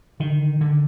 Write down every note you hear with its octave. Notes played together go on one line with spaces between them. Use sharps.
D3 D#3
D3